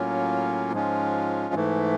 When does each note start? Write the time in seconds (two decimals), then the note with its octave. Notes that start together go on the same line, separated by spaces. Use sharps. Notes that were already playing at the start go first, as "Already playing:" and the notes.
Already playing: A2 F#3 A#3 C#4 F4
0.72 G#2 F3 G#3 C#4 F4
1.54 G#2 E3 A3